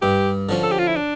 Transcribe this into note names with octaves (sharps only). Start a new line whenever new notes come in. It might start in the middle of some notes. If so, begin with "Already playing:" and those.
G2 G4
D3 F3 C#4
A4
G4
F4
E4
D4